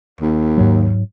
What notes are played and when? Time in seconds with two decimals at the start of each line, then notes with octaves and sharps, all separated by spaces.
0.21 D#2
0.57 G#2 F#3